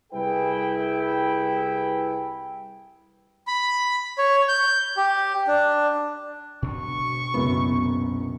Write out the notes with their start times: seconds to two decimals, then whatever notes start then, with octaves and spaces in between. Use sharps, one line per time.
0.13 C2 G3 E4 G#4 B4 G5
3.47 B5
4.18 C#5
4.48 G6
4.97 G4
5.48 D4
6.62 B2 C4 D4 C#6
7.34 F#1 C2 F#2 B3